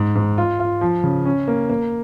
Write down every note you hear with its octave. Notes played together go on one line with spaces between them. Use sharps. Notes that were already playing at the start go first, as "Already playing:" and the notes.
Already playing: G#2
G#2
F4
F4
F3
C#3
C#4
A#3
A#3